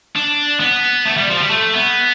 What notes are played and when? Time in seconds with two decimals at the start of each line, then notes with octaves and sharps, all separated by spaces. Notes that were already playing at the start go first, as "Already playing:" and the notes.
0.16 D4
0.60 B3
1.05 A3
1.17 G3
1.29 F3
1.40 G3
1.50 A3
1.74 B3